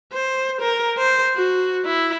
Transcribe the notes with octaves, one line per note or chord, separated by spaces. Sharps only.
C5
A#4
C5
F#4
E4